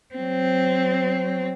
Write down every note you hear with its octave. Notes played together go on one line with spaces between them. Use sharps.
F#3 C4